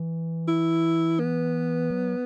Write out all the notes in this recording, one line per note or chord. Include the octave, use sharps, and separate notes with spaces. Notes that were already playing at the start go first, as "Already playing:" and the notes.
Already playing: E3
E4
B3
F#3